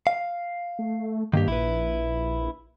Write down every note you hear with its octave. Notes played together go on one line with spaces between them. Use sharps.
F5
A3
G2 D#3 A#3 G4
A#1 E4 B4